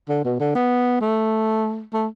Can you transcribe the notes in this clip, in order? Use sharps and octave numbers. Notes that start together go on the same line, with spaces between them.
D3
B2
D3
B3
A3
A3